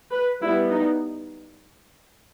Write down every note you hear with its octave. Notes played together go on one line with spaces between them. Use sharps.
B4
G3 B3 E4
D#4